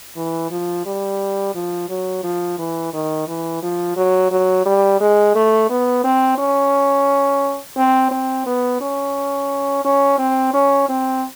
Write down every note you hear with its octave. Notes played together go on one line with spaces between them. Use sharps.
E3
F3
G3
F3
F#3
F3
E3
D#3
E3
F3
F#3
F#3
G3
G#3
A3
B3
C4
C#4
C4
C4
B3
C#4
C#4
C4
C#4
C4